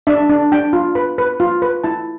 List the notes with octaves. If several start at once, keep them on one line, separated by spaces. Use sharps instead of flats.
D4 E5
D4
D4 G5
F4
B4 B5
B4
F4
B4
E4 A5